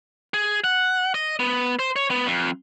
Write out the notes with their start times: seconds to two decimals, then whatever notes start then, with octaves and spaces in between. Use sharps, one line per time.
0.34 G#4
0.64 F#5
1.14 D#5
1.40 B3
1.79 C5
1.96 C#5
2.11 B3
2.26 F2